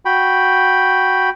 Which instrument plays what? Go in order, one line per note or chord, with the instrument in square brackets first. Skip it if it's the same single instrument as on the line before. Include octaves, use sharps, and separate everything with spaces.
[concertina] F#4 G5 B5